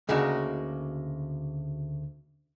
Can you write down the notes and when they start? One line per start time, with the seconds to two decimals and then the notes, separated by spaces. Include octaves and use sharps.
0.09 D2 C#3 A#3 D4 D#4 F#4